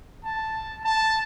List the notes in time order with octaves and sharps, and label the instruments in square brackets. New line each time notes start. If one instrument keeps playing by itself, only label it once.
[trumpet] A5
A5